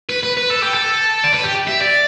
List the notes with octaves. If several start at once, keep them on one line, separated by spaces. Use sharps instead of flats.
B4
B4
B4
A4
G4
A4
D5
B4
G4
E5
D5